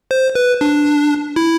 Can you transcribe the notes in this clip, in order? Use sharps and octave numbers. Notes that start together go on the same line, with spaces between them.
C5
B4
D4
E4